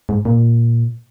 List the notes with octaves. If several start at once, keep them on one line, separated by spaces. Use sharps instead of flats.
G#2
A#2